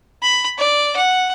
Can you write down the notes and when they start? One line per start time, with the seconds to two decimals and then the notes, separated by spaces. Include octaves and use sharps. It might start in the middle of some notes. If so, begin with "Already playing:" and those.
0.23 B5
0.58 D5
0.96 F#5